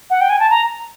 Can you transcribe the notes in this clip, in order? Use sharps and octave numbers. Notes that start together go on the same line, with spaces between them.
F#5
G5
G#5
A5
A#5